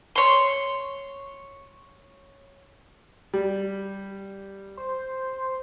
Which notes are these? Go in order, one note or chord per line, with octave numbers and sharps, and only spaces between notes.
C#5 C6
G3
C5